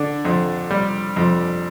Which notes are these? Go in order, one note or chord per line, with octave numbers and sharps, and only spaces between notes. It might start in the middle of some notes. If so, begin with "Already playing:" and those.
Already playing: D3 D4
F2
G3
F2